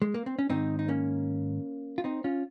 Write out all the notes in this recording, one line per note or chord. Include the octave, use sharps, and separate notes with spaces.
G#3
A#3
C4
C#4
G#2 D#3 C4 D#4
D#4
A#3 C#4
F4
C4 D#4
C#4 F4